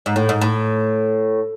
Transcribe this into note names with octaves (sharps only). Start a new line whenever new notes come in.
G#2
A2
G#2
A2